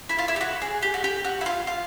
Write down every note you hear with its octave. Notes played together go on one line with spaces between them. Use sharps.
E4
F4
E4
G4
F#4
G#4
G4
F#4
G4
F#4
E4
F4
F4